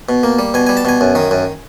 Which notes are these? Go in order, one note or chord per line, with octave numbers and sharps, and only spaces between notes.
B2
A#3
G3
B2 G#5
G3 G#5
A5
B2 G#5
F#2
D#3
F#2